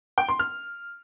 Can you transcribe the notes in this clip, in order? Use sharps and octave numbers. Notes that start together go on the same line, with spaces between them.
G5
C6
F6